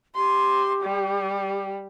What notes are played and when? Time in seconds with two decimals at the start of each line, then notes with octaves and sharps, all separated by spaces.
0.15 G4 C6
0.83 G3